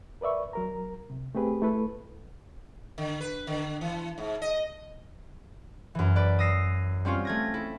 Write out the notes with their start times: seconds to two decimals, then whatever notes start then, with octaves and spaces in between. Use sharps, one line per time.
0.21 A#4 B4 D5 E5 C#6
0.53 F#3 A#4 A#5
1.10 C3
1.35 A3 C4 G4 G#4 B4
1.62 A3 E4 A4 B4
2.98 D3
3.21 B4
3.47 D3
3.81 E3
4.18 G#2
4.42 D#5
5.95 F#2 E3
6.16 B4 D5
6.39 D#6 E6 A#6 C7
7.05 G3 C4 C#4 F4
7.25 A3 G#6 A#6
7.54 E4 A4